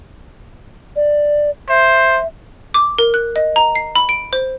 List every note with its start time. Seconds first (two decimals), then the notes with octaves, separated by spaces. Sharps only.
0.96 D5
1.69 C5 E5
2.74 D6
2.99 A#4
3.14 F#6
3.36 D#5
3.56 A#5
3.75 C7
3.95 B5
4.09 D7
4.33 C5